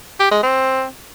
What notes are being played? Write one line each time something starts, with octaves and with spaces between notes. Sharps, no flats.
G4
G#3
C4